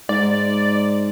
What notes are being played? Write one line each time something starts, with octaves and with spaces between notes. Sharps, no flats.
G#2 D5